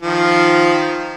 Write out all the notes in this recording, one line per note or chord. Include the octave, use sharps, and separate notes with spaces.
D#3 F3